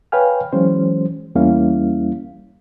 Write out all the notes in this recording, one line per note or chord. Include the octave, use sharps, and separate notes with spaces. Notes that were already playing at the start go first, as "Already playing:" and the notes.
B4 C#5 F5 G5 G#5 F6
E3 F#3 G#3 C#4 C5
E2 G3 A#3 C#4 E4 F5